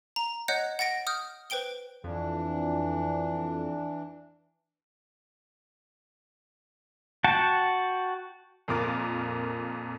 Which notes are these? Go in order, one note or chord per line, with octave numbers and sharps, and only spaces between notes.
A#5
C#5 D#5 F#5 F#6 G6
F#5 A6 A#6 D7
D#6 F6 G6
B4 C5 G5 D7 G7
F2 E3 D4
F#4 F#5 G5 A5
F2 A#2 A#4 D6 A6